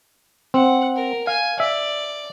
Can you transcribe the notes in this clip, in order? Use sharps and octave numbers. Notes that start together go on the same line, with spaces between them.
C4 F#5
A#4
F5 G#5
D5 E5